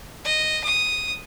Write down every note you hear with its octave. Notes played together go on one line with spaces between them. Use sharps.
D#5
D#6